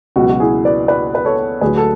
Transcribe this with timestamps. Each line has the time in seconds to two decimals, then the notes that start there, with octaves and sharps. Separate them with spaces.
0.16 C#2 B2 F#3 F#4
0.29 F#4
0.40 E4 G#4
0.65 B4 D5
0.88 B4 D5
1.15 B4
1.25 A4 C#5
1.61 D2 D3 F#3 G#4 B4
1.77 A4